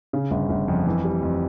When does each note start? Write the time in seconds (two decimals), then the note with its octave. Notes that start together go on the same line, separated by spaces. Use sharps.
0.13 C#3
0.31 G1
0.49 G1
0.68 F2
0.86 E3
1.04 G3
1.23 F2